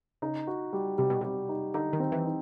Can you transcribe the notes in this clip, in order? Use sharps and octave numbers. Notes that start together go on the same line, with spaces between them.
C#3 D#4
F#4
G3
C3 G3
B2
C3 G3
D#4
D3 D#4
D#3
C4
E3
D#4